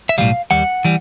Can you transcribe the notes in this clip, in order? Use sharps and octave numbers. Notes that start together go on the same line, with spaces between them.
E5
B1 A2 E3 G3 F5
D#2 D#3 G3 F#5
E3 G3